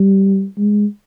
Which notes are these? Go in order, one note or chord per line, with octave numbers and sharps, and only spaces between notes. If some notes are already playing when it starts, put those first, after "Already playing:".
Already playing: G3
G#3